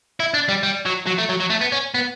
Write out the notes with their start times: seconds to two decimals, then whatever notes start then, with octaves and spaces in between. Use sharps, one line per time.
0.20 E4
0.34 D4
0.49 G3
0.63 G3
0.85 F#3
1.06 F#3
1.18 A3
1.29 F#3
1.40 F#3
1.50 A3
1.61 B3
1.72 C#4
1.94 B3